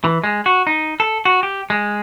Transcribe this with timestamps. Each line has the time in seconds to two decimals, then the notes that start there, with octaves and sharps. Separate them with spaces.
0.04 E3
0.24 G#3
0.46 F#4
0.67 D#4
1.00 A4
1.25 F#4
1.43 G4
1.70 G#3